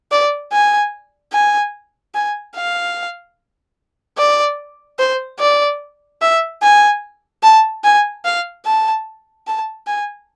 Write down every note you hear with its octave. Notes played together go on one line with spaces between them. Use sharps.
D5
G#5
G#5
G#5
F5
D5
C5
D5
E5
G#5
A5
G#5
F5
A5
A5
G#5